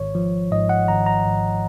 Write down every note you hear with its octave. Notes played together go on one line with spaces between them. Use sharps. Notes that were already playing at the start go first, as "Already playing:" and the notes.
Already playing: G#1 C#5
F3
G#2 D#5
F#5
G#1 A#5
A#5
G#1